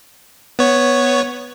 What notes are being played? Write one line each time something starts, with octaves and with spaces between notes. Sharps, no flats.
B3 C#5